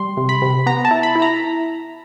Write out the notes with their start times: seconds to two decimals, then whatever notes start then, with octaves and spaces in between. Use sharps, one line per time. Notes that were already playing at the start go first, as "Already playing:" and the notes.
Already playing: G3 C6
0.17 C3
0.29 B5
0.42 C3
0.66 B3 A#5
0.85 A5
0.91 E4
1.03 B5
1.16 E4
1.22 A#5